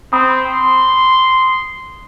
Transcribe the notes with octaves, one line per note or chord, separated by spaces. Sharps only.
C4 B5 D#6
C6